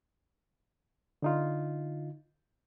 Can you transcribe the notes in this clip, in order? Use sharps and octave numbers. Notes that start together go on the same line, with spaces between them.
D3 D#4 F4